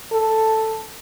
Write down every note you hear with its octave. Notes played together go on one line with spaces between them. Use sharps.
A4